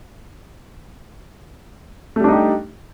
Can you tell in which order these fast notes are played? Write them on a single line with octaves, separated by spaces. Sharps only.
A3 G3 D4 D#4 G4